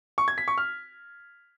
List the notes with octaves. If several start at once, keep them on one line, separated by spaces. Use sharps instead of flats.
C#6
G#6
B6
C#6
F6